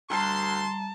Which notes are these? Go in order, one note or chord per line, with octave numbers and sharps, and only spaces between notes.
D2 G3 A5 A#5 C6